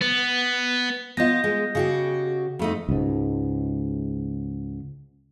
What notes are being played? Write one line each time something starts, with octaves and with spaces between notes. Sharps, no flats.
B3
B3 F4 D#5 G6 A#6
G#3
C#3 F#4 G4
F2 A3 D#4
C#2 G#2